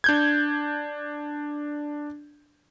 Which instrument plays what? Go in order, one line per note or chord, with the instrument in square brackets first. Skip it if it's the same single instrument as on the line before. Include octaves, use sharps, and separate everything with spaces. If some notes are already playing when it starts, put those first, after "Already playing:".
[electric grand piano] D4 G6 G#6